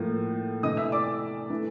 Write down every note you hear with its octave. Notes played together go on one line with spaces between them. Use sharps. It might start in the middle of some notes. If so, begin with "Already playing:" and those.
Already playing: A2 F3 A#3
C3 E3 A3 D#5 D#6
E5 E6
D5 D6
E3 A3